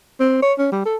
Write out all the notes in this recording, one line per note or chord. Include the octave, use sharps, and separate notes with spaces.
C4
C#5
C#4
G3
A4